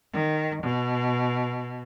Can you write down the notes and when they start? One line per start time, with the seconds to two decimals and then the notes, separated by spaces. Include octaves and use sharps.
0.13 D#3
0.63 B2